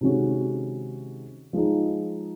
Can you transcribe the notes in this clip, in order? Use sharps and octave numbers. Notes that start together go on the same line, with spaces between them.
C3 D#3 G#3 C#4 F#4
F3 G#3 D#4